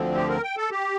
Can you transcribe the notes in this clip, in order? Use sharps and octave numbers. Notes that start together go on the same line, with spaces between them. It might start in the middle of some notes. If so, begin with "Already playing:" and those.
Already playing: D2 D3 F3 C4
G4
A#4
G5
A4
G4